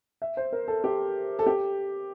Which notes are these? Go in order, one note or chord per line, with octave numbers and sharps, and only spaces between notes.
E5
C5
A#4
A4
G4
A4
G4